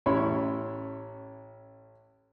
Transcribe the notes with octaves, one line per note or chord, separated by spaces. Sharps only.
A1 C#4 E4 C#5 B5 C6